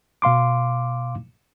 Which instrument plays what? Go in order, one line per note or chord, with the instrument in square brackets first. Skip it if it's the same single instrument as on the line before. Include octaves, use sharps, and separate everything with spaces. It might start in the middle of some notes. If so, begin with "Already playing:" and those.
[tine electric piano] B2 F5 C6 D6